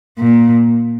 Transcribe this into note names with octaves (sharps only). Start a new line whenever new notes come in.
A#2